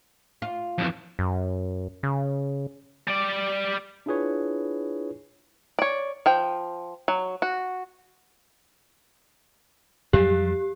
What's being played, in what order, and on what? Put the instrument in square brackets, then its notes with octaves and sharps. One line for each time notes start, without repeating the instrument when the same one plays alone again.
[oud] F4
[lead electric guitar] F2 E3
[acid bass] F#2
C#3
[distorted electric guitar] G3 D5
[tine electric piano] D4 E4 F4 G#4 B4 C#5
[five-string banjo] C#5 D5
F3 G5
F#3
F#4
[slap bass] F2 F#3 G3 [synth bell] G4